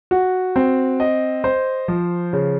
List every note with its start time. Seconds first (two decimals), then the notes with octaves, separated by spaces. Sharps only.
0.11 F#4
0.56 C4
1.00 D#5
1.44 C5
1.88 F3
2.33 C#3